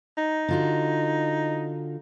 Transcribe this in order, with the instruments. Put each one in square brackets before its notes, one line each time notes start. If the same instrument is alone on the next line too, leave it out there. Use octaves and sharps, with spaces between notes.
[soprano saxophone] D#4
[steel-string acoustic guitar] D3 F4 F#4